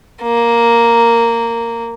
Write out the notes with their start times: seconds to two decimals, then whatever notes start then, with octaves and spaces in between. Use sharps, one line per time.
0.23 A#3